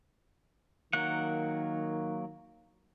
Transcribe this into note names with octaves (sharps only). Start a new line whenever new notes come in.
D#3 F#3 A#3 F#5